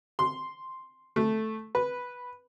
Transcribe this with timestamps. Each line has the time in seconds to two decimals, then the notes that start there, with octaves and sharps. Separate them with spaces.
0.19 C6
1.16 A3
1.75 B4